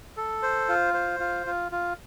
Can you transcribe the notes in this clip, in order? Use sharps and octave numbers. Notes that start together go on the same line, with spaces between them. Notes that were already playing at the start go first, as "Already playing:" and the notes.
A4
C5
F4
C5
F4
F4
F4